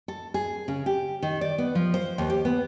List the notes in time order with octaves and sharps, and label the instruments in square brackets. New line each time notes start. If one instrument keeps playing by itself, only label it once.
[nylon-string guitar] A4
G#4
C#3
G4
D#3
D5
B3
F3
C5
D#2
G4
B3